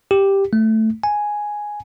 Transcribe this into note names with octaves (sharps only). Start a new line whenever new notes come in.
G4
A3
G#5